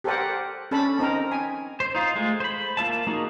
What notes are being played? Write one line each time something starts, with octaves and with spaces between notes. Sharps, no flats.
G4 A4 A#4 C5 D5 F#5
C#4 D4 A4 A5 B5
C4 D#4 A#4 A#5
G#5
C5
D#4 F4 C5
G#3 A3 F4
C5 B5
A#3 F4 E5 A5
A#3 D#4 F#4 G#4